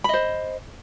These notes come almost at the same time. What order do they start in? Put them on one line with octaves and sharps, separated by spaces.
B5 D#5 C5